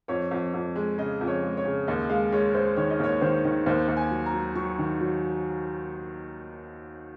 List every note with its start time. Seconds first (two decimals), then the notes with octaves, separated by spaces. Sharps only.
0.08 F2 C#5
0.31 F2
0.54 F2
0.76 G#3
0.98 C#3 D#5
1.21 F2
1.27 C#5
1.43 G#3
1.57 C#5
1.65 C#3
1.87 D#2 D#5
2.09 G#3 F5
2.32 G#3 C#5
2.54 G#3 C5
2.77 D#3 C#5
2.90 D#5
3.00 D#2 C#5
3.21 D#3 C5
3.45 D#3
3.66 D#2 C5
3.88 D#2
3.97 G#5
4.11 F#3
4.26 A#5
4.33 F#3
4.55 F#3 C#6
4.79 D#3
5.00 F#3